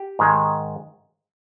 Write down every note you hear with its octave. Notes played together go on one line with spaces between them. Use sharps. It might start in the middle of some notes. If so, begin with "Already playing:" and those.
Already playing: G4
G#2 D#3 G#3